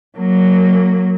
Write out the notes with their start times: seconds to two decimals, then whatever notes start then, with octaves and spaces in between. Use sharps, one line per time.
0.18 F#3 A#3